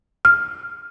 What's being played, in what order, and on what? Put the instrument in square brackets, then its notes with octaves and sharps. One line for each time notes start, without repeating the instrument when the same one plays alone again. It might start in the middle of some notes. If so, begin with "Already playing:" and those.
[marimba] F6